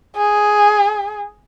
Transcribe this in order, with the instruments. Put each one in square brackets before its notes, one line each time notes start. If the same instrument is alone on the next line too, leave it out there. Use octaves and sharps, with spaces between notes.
[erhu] G#4